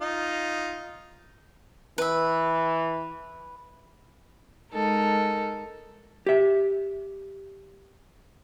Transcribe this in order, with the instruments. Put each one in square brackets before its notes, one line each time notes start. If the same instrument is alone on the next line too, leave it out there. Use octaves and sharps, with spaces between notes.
[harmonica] D#4 F4
[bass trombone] E3 [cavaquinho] B4 E5
[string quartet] G#3 D#4 A4 A#4
[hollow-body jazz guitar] G4 E5